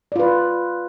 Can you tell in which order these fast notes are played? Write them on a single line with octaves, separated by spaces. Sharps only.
D5 F4 B4